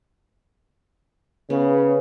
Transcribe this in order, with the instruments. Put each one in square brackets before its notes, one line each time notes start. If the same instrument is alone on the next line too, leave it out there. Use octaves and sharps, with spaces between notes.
[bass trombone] C#3 [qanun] B3